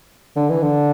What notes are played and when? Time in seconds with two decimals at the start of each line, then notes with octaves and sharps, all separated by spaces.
0.36 D3
0.50 E3
0.62 D3